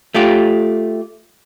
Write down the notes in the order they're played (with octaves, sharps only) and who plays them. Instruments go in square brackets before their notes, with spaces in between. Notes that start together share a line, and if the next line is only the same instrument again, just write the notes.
[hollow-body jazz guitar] A3 F4 G4